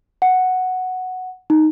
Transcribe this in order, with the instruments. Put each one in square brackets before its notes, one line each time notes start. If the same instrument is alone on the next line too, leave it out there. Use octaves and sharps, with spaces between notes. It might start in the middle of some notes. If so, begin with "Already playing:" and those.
[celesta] F#5
D#4